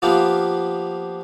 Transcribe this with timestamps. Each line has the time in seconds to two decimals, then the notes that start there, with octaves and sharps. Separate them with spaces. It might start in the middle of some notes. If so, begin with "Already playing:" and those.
0.02 F3 A#3 B3 F4 G4